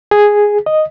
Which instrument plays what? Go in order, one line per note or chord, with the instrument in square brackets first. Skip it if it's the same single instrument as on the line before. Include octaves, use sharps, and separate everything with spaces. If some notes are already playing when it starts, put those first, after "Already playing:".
[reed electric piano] G#4
D#5